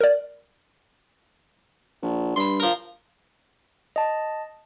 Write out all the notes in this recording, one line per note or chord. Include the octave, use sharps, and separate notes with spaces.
A#4 D5
A#1
G2 B5 C6
F3 A#4
D#5 A5